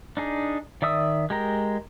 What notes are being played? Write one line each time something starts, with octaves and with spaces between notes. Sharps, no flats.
D4 D#4 G#4
D#3 D5 E5 D#6 E6
G#3 G4 A#4 A#5